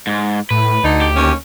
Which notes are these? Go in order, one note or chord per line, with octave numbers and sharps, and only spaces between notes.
G#2
A2 B4
D2 D3 D#4
G4
D#2 C#4